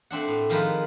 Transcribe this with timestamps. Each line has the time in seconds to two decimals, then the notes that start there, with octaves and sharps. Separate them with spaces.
0.11 A3 C4 D4 F#5
0.28 A2
0.50 D#3 F3 G#3 A#4 B4